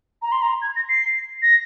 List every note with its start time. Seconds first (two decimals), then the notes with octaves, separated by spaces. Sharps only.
0.22 A#5
0.32 C6
0.42 A#5
0.62 G#6
0.76 A#6
0.89 C7
1.42 A#6